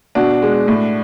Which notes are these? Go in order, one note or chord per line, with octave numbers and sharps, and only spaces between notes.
B2 D4 F#4
G#3
A2